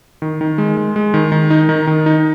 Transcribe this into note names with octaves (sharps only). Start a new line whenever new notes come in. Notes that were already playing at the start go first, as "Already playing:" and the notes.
D#3
D#3
G#3
G#3
G#3
D#3
D#3
D#4
D#3
D#3
D#4